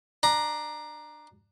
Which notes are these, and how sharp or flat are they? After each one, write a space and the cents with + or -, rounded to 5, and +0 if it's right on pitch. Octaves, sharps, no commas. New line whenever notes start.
D4 +20 A#5 +5